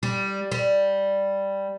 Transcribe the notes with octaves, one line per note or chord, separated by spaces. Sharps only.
G3
G3